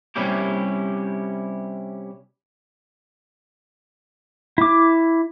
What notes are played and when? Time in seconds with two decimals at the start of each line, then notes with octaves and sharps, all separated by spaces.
0.16 C3 G3 C#4 E4 G4
4.58 E4 D6